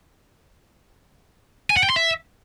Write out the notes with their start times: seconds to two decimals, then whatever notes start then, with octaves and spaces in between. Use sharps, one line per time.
1.70 G#5
1.77 F#5
1.83 G5
1.90 C6
1.96 E5